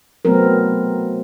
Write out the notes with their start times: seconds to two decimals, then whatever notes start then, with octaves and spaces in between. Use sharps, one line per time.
0.25 F#3 A3 B3 C4 A#4